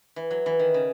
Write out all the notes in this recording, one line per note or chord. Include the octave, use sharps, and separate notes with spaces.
E3
F#3
E3
D#3
C#3